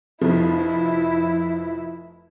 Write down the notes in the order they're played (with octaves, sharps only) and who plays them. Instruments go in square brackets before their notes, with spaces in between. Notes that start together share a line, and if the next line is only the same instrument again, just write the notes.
[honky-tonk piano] F1 F3 [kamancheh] E4